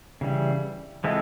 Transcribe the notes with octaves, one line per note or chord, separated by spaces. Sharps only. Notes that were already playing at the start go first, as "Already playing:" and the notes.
C#3 E3 G3
F3 G#3 C4 E4 A4